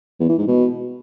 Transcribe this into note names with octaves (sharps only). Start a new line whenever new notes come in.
E2
E3
G#2
B2